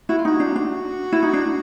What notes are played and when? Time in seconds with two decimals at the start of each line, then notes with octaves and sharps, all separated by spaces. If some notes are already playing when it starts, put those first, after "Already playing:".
0.09 E4 F#4
0.18 F4
0.25 D#4 F#4
0.40 D4
0.56 D4
1.13 E4
1.23 D#4
1.33 D4